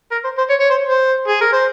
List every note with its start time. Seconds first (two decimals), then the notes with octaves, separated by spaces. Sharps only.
0.11 A#4
0.24 C5
0.38 C5
0.49 C#5
0.60 C#5
0.70 C5
0.89 C5
1.28 G#4
1.41 A#4
1.53 C5